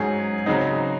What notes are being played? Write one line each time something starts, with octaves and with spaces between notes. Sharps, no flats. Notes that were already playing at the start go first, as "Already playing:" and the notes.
Already playing: G#2 F#3 C#4 G#4
C#3 F#3 C4 D#4